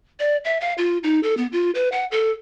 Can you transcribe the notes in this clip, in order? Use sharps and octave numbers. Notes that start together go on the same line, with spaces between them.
D5
E5
F5
F4
D#4
A4
B3
F4
B4
F#5
A4